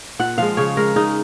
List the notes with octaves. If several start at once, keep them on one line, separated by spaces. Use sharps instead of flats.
A#2 F#5
F3 G#3 F5
C#3 C#5
G#3 A#4
C#3 D#4